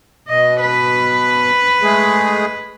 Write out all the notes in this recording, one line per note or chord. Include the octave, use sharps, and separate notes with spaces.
B2 D#5
B4
G#3 A3 G#4